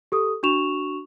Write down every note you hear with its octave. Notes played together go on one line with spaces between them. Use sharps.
G4 A4 D#6
D4 F#4 C#6 E7 F7